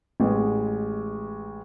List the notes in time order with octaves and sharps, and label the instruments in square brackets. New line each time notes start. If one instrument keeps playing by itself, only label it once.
[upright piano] A1 G#3